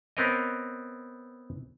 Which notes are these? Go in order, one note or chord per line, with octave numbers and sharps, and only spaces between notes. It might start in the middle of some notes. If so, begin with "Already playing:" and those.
B3 C4 A#4 C#5 D#5